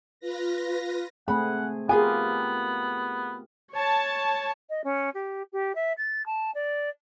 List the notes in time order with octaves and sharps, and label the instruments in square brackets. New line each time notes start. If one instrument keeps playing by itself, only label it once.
[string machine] F4 B4 A#6
[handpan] A3 C4 G#4 [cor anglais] F#5 [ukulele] B5
[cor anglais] B3 [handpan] F4 G4 A#4 [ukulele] G#4 F5 G#5
[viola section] C#5 A5
[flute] D#5
C#4
G4
G4
E5
A6
A5
D5